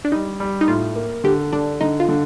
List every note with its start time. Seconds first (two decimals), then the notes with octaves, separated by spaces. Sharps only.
0.05 D4
0.12 G3 D#4
0.40 G3
0.61 D#4
0.68 A2 F4
0.96 A#3
1.24 D3 G4
1.53 D3 D4
1.81 D3 D#4
2.00 F4
2.09 D3